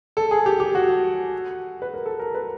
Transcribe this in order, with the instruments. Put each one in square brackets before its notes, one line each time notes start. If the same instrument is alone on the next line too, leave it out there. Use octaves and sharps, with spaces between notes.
[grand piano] A4
G#4
G4
G4
F#4
B4
A#4
A4
A#4
B4